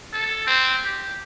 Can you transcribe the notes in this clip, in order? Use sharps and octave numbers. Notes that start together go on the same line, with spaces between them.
A4
C4
G4